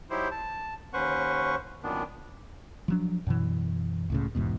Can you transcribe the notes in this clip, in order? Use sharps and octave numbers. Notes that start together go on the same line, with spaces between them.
F#3 D#4 E4 G4 C5
A5
D#2 C#4 B4 C5 F#5 C#6
F#2 A#2 D#3 B3 D4
F3 F#3 D4
F#2 B2 E3
C#2 A2 C#3
F#1 E2 G#2 B2